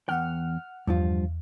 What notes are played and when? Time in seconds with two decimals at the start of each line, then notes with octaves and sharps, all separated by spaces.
0.09 E2 F#5 G5 F6
0.87 E2 G2 F3 F4